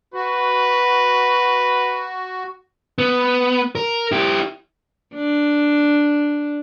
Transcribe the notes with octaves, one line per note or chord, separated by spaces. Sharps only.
F#4 B4
B3
A#4
E4 G4
D4